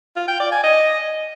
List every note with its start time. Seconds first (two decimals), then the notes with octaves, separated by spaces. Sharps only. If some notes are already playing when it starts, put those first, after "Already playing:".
0.16 F4
0.28 G5
0.40 D5
0.52 G#5
0.63 D#5